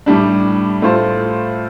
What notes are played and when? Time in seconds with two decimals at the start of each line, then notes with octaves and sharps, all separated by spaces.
0.06 A2 G3 D4
0.82 A2 A3 F4 C5